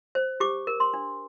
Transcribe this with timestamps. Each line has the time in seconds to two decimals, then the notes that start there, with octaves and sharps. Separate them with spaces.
0.15 C5
0.40 G4 D6
0.67 A#4
0.80 C6
0.94 D4